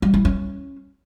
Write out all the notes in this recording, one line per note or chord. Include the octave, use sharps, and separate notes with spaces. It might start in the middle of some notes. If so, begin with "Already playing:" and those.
G3
E4
C#4